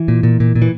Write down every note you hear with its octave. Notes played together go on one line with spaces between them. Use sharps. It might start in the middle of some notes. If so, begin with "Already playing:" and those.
Already playing: E3
A#2
A#2
A#2
A#2
E3